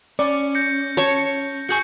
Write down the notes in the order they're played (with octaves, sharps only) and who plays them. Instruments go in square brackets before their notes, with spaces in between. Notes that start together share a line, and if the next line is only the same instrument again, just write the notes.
[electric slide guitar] C#4 [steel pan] D5
[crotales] G6 A#6 C#7
[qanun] C#5 A5 C#6
[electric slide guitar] F#4 G#4 G#5 [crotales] C#6 G6 C#7